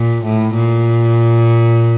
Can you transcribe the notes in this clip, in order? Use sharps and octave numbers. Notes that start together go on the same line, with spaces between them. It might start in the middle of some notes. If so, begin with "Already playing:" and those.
Already playing: A#2
A2
A#2